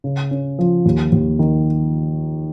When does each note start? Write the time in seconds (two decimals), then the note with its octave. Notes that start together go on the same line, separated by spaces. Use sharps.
0.04 C#3
0.31 C#4
0.59 F3
0.86 D#2
1.12 D#2
1.39 D#3